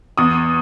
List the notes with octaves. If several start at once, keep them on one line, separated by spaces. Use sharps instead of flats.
E2 D#6